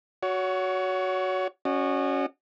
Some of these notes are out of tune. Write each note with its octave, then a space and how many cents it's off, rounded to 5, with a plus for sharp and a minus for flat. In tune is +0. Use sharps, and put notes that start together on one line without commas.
F#4 +0 C#5 +25
C#4 +0 F#4 +0 D#5 -40